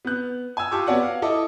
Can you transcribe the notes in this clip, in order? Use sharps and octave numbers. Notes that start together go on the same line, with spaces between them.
B3 F#6
G#5 E6
F4 G4 A5 C#6 D6 E6
B3 F#4 C#5 D5 F#5
F5
E4 A4 D#5 A5 D6